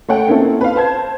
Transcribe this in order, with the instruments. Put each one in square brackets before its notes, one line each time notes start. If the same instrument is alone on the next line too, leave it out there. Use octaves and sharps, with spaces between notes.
[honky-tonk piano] A3 C#5 F#5 G5
A#3 C4 C#4 D#4 E4 A4
B4 F5
C5 A5 G#6